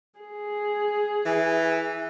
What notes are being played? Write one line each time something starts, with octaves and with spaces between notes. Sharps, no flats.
G#4
E3